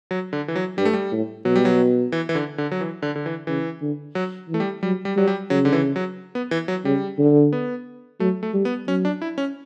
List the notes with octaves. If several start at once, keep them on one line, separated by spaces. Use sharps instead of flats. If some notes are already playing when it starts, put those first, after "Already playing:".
F#3
D3
E3
F#3
G2 G3
A3
G3
A2
B2 F#3
G3
F#3
E3
E3
D3
D3
F#3
E3
D3
D3
E3
C#3 E3
D3
F#3
E3
A3
G3
F#3 G3
G3
F#3 G3
G3
C#3 F#3
D3
E3
F#3
B3
E3
F#3
C#3 G3
D3
B3
F#3 A3
A3
G3
B3
F#3 C#4
D4
E4
C#4